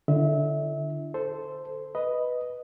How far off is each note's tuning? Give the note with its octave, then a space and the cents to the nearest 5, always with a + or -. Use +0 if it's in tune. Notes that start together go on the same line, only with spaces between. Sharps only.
D3 +0 E4 +45 E5 -30
A4 +0 C5 -10
B4 +0 D#5 +0